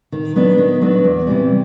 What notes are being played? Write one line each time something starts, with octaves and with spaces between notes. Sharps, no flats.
D#3
F#3 B3 D4
D#3
F#3 B3 D4
E2
C3 E3 G3